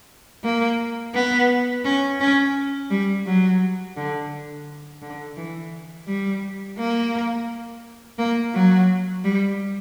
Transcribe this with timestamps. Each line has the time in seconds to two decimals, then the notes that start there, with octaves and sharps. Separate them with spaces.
0.44 A#3
1.14 B3
1.85 C#4
2.20 C#4
2.90 G3
3.26 F#3
3.97 D3
5.02 D3
5.37 E3
6.07 G3
6.78 A#3
8.18 A#3
8.54 F#3
9.24 G3